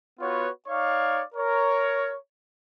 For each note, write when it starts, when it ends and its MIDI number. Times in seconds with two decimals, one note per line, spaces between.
0.20 0.49 59
0.20 0.49 65
0.20 0.49 66
0.20 0.49 71
0.20 0.49 73
0.68 1.23 63
0.68 1.23 73
0.68 1.23 74
0.68 1.23 77
0.68 1.23 85
1.35 2.16 70
1.35 2.16 73